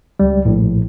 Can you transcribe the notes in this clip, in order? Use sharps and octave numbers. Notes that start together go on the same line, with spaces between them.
C#2 G3
A#1 A2